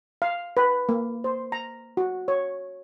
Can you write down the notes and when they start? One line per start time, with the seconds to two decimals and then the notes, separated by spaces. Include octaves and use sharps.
0.22 F5
0.57 B4
0.89 A#3
1.24 C5
1.52 A#5
1.97 F#4
2.28 C#5